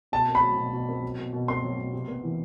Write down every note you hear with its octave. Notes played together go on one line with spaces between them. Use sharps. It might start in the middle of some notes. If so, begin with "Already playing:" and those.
B2 A5
C4
B5
F#3
B2
B2
C4
F#3
B2
B2
C4 C6
F#3
B2
C3
B3
E3